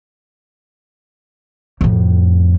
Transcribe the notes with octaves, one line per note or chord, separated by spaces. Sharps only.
F2 A2